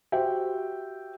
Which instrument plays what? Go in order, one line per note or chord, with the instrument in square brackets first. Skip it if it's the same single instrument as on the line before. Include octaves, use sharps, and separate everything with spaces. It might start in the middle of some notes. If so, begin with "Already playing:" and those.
[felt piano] F#4 G4 C5 E5 G5